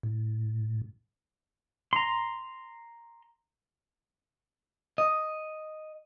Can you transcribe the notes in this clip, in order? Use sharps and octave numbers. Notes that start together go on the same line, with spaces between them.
A2
A#5 C6
D#5